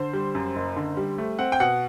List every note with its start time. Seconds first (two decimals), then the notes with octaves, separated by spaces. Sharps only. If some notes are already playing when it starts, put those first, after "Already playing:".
Already playing: D3 C5
0.13 G3
0.35 F#2
0.56 F#1
0.76 D3
0.97 G3
1.18 A3
1.39 C4 F#5
1.52 G5
1.60 B2 F#5